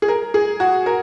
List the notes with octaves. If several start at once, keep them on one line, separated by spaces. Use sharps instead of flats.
G#4
A#4
G#4
F#4
A#4